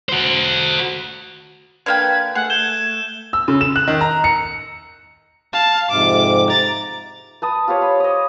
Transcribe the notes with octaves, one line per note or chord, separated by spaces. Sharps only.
F#4 C5
D3 A#3 B4 G5 G#6
A3 G#4 F#5
G6 G#6 E7 G7
E6
C#3
E7
F#6
D#3
A#5
C#7
F5 A5
F2 G#2 C3 D6
A#5 A6
B4 A5 D#6
F4 G4 C5 C#5
B5
D#5 D#6